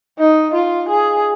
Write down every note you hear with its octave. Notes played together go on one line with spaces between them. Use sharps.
D#4
F4
G#4